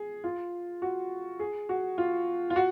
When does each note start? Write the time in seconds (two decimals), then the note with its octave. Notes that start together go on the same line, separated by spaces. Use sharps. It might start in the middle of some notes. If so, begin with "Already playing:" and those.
Already playing: G#4
0.24 F4
0.82 F#4
1.39 G#4
1.69 F#4
1.98 F4
2.50 F4
2.56 F#4